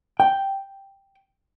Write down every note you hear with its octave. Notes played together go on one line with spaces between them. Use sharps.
G5